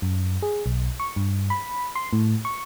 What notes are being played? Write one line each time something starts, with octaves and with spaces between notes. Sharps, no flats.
F#2
G#4
B1
C#6
G2
B5
C6
A2
C#6